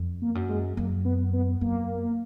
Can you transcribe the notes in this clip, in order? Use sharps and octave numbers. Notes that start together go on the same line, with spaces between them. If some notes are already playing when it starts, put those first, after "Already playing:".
Already playing: F2
A#3
F#2
G#3
F#2 A#3
B3
B3
F#2 A#3